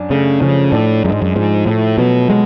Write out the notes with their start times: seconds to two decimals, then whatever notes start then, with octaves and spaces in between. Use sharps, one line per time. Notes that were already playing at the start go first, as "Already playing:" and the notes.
Already playing: F#2 D4
0.10 C#3 A3
0.42 C#3 F3
0.72 A2 D4
1.04 F#2 G#3
1.12 G#2
1.22 F#2
1.36 G#2 F3
1.66 A2 A3
1.98 B2 F#3
2.30 B2 G#3